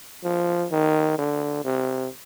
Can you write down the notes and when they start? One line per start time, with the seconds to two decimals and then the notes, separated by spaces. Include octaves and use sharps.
0.24 F3
0.71 D#3
1.18 D3
1.65 C3